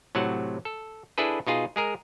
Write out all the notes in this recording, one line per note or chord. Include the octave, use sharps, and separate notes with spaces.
A2 C3 F#3 F#5
A4
D4 E4 G#4 A4 B4
B2 D#4 F4 G#4
G#3 G#4 A#4